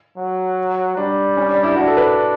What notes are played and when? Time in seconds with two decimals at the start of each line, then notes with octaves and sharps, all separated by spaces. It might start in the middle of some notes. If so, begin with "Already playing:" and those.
0.18 F#3
0.97 G3 D4
1.37 C#4
1.51 D4
1.63 E4
1.76 D4 F#4
1.88 A4
1.97 B4